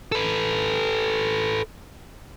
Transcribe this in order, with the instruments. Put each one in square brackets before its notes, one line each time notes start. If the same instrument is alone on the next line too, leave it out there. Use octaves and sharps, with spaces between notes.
[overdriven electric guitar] A4 B4